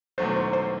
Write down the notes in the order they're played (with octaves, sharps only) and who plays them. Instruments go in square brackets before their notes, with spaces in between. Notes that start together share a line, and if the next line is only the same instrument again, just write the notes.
[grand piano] E1 E2 D#3 F#3 A3 [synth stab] C5
[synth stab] C5
C5